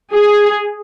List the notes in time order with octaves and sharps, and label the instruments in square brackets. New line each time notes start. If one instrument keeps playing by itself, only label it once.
[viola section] G#4